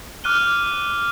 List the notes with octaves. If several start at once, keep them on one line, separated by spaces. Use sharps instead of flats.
D6 F6 F#6 D#7 G7